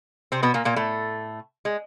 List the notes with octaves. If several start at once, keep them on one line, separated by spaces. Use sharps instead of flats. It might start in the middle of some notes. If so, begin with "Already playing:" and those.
C3 C4
B2 B3
A#2 A#3
A#2 A#3
A2 A3
G#3